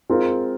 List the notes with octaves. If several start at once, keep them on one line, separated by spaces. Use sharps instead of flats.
G#3 C4 F4 A#4